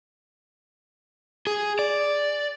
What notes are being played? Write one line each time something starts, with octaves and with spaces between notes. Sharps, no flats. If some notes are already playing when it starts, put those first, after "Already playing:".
G#4
D5